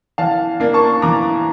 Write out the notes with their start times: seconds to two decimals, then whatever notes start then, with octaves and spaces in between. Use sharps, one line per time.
0.18 E3 F5 A5
0.60 A#3 D4
0.74 A5 C#6
1.02 E3 A#5 D6